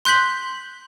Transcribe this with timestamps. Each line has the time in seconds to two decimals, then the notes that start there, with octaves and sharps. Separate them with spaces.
0.05 C6 F#6 G6 B6 F#7